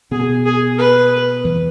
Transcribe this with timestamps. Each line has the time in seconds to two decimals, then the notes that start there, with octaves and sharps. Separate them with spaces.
0.11 B2 B3 G#4
0.46 G#4
0.78 B4
1.44 E2 E3